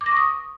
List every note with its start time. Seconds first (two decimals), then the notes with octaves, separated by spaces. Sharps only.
0.01 D6
0.06 A#6
0.11 C#6
0.17 D#6